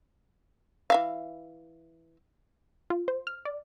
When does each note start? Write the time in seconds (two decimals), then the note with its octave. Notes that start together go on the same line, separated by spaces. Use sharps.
0.90 E3 E5 F5
2.90 F4
3.08 C5
3.27 F6
3.45 D5